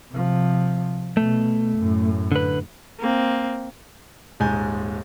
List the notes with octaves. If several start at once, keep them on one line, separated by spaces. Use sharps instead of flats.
C3 F3
B2 A3
F#2 A2
D3 B4
A#3 C4
D#1 G#2 G#3 G#5 G6